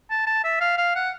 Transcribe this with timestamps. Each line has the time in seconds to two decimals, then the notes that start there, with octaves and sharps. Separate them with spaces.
0.10 A5
0.26 A5
0.44 E5
0.60 F5
0.78 F5
0.95 F#5